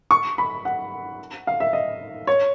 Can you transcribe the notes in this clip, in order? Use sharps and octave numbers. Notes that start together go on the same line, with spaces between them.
C#6
B5
F#5
F5
E5
D#5
C#5